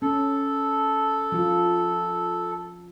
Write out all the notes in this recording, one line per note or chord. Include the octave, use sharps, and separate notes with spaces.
C#4 A4
F3 F4